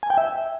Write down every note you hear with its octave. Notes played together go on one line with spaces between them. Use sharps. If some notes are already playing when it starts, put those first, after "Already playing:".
G#5
G5
E5